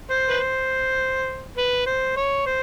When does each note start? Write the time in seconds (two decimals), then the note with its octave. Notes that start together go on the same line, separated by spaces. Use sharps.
0.10 C5
0.29 B4
0.39 C5
1.58 B4
1.86 C5
2.17 C#5
2.46 C5